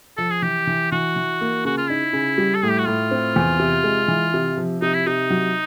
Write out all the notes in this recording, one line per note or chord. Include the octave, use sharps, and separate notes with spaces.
F3 A4
G#4
E3 G4
E3
E3 F#4
E3
A#3
C#3 F#4
F4
D#4 E4
C#3
G3
A4
A2 G#4
G4
F#4
A2 F4
C4
E2
C3
G#3
E3
C3
F3
C3 D#4
E4
C3 D#4
F#3